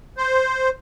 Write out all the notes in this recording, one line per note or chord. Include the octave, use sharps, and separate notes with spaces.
C5